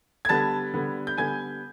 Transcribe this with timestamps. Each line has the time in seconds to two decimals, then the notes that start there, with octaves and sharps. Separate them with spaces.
0.25 G#6
0.29 D3 G3 B3 A5 A6
0.74 D3 G3 B3
1.07 G6
1.17 D3 G3 B3 G#5 G#6